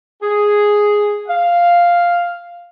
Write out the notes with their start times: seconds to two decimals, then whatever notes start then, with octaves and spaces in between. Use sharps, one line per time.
0.22 G#4
1.28 F5